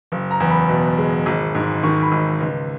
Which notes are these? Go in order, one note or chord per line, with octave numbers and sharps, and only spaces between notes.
F#1
A#5
E2
B5
B2
G#3
G#1
G#2
D#3 C#6
B5
G#1
C#2